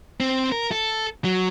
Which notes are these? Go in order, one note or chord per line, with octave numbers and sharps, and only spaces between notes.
C4
A#4
A4
F#3